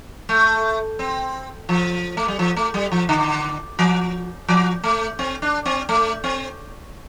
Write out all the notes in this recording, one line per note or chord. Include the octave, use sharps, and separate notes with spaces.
A3
C4
F3
A3
G3
F3
A3
G3
F3
D3
F3
F3
A3
C4
D4
C4
A3
C4